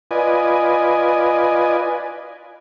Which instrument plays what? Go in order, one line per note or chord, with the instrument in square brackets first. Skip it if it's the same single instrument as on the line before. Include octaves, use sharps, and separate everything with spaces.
[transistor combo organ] F4 B4 D5 D#5 G#5